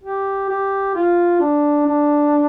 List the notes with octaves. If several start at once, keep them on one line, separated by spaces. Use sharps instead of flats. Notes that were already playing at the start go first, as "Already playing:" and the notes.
G4
G4
F4
D4
D4